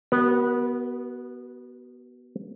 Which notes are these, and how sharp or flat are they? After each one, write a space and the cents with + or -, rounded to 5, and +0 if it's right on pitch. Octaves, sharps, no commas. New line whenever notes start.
B3 -15 F#4 +35 A#4 +30